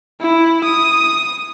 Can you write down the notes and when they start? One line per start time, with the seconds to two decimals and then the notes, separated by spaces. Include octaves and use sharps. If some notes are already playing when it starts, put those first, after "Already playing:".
0.21 E4
0.64 D#6